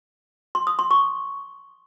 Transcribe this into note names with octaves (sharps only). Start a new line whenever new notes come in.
C6
D#6
C6
C#6